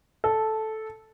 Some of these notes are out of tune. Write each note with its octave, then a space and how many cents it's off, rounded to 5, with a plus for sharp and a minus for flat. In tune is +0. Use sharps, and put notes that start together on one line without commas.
A4 -5